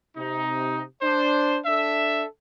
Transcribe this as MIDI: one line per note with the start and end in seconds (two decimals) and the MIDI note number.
0.17 0.82 48
0.17 0.82 63
1.02 1.58 62
1.02 1.58 72
1.65 2.24 62
1.65 2.24 69
1.65 2.24 76